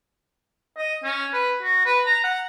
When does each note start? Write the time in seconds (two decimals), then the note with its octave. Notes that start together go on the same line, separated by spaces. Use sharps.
0.77 D#5
1.04 C#4
1.33 B4
1.62 F#4
1.85 B4
2.06 A#5
2.24 F#5